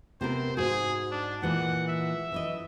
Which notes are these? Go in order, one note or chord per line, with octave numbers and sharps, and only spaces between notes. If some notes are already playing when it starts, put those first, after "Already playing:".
C3 B3 A#4 C5
G#2 F#4 G#4
D4
A#2 E3 G#3 F#5
E5
E3 E4 D#5